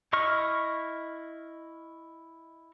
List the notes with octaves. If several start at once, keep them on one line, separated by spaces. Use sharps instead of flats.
E4 D#5 C#6 F6